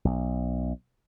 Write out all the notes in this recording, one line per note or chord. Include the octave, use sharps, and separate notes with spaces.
B1